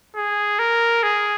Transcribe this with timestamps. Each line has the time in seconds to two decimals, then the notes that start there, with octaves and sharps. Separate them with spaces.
0.16 G#4
0.59 A#4
1.03 G#4